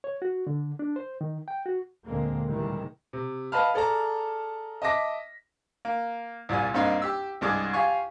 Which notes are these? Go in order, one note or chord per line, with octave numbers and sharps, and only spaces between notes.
C#5
F#4
D3
D4
C5
D#3
G5
F#4
D2 A#2 D3 G#3 A#3 C4
A2 C3 D#3 E3 G3 G#3
C3
B4 D#5 F5 A5 B5 F6
G#4 A4 D5 A5 A#5
D#5 E5 A5 D6 A#6 B6
A#3
C2 A#2 G3 G#5
G2 A#3 C4 D4 D#4
G4 E6
C2 G2 G#3 D6 D#6
F4 G4 F5 G#5 C#6